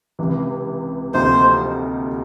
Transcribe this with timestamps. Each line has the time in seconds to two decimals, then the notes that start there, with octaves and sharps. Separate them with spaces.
0.19 C#2 C3 E3
1.14 D2 C3 F3 A#3 D#4 C5